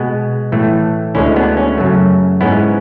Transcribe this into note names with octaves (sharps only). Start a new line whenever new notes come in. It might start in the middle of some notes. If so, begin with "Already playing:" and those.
Already playing: B2 G#3 B3
A2 E3 A3
D2 D3 G#3 C#4 E4
B3 D4
C#4
F#2 C#3 F#3 A3
G#2 G#3 B3 C#4 E4